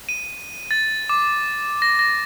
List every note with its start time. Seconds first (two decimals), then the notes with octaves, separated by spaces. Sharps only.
0.09 D#7
0.71 A6
1.09 D6
1.82 A#6
1.99 A#6